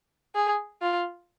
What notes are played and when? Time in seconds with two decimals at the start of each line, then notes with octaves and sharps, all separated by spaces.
0.35 G#4
0.82 F4